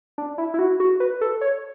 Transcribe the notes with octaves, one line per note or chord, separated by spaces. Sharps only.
D4
E4
E4
F#4
F#4
B4
A4
C#5